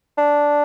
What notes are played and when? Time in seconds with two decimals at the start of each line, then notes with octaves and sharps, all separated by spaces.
0.18 D4